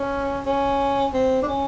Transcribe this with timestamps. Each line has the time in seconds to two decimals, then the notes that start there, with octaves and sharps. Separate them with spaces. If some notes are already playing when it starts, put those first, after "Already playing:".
Already playing: C#4
0.46 C#4
1.14 C4
1.43 D4
1.48 C#4